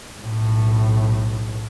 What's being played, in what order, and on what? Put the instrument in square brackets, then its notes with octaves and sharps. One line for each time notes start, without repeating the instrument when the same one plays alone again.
[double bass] B1 A2